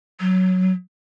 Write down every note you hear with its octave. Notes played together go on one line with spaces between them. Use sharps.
F#3